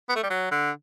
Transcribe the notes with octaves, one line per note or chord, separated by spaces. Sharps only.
B3
A3
G3
F#3
D3